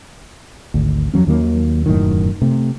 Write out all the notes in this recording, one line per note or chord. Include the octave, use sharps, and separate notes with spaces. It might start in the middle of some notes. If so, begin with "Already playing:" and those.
G#1 D2
F2 F3 F#3 C#4
D#2 D#3 F#3 A#3
E1 F#2 A2 D#3
C3 A3